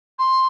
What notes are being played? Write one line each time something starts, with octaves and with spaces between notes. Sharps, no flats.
C6